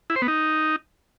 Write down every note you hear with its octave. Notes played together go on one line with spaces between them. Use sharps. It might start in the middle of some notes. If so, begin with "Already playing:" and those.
E4
C5
B3
D#4